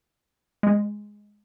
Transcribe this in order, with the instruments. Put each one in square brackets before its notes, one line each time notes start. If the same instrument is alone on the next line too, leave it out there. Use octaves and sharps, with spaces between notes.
[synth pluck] G#3